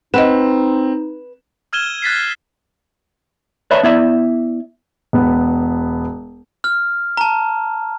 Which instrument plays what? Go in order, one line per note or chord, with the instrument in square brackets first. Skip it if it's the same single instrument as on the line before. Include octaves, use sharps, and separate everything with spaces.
[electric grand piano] C4 E7 [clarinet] D#4 [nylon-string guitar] B4 [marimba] D#5 F#5
[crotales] E6 F6 G#6 D#7 E7 G7
F#6 A6 B6 C7
[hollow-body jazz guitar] B4 C#5 D5 E5 A5 B5
B3 E4 D5 E5
[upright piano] E1 B3
[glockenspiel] F6
A5 A#5